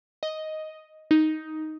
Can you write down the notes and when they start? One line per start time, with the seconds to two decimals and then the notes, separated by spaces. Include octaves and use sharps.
0.23 D#5
1.11 D#4